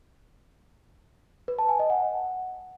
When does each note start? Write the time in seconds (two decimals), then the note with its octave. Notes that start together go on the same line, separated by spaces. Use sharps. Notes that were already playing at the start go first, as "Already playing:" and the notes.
1.48 B4
1.59 A5
1.69 G#5
1.79 D#5
1.90 F#5